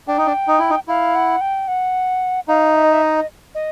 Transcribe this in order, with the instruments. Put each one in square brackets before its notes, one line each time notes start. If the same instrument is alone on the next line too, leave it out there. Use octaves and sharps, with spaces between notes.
[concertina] D4 [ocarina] G5
[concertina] D#4
D4
D#4
E4
D#4
[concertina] E4 [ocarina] F5
[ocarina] F#5
G5
F#5
[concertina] D#4 [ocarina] F5
[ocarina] E5
D#5
E5
D#5
D#5